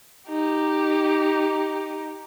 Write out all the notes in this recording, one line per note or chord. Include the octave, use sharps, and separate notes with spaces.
D#4 G4